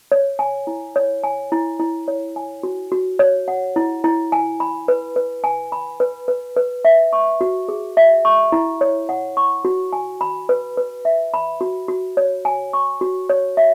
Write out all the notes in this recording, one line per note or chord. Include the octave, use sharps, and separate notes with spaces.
C#5
G#5
E4
C#5
G#5
E4
E4
C#5
G#5
F#4
F#4
C#5
F#5
E4
E4
G#5
B5
B4
B4
G#5
B5
B4
B4
B4
E5
C#6
F#4
G#4
E5
C#6
E4
C#5
F#5
C#6
F#4
G#5
B5
B4
B4
E5
B5
F#4
F#4
C#5
G#5
C#6
F#4
C#5
E5